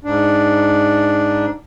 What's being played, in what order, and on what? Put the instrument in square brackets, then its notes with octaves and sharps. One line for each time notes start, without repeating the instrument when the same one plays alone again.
[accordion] G#2 D4